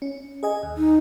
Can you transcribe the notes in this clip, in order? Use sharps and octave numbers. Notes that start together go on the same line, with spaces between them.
C#4
G#4 D#5 G#5
D#2
D#4